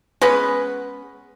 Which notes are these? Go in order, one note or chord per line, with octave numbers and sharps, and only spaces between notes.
G#3 B3 C#4 B4